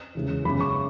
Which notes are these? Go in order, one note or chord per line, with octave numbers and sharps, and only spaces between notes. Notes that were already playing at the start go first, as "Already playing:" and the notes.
E2 C#3 E3 G#3
F#2 C#3 G#3 B3 B5
C#6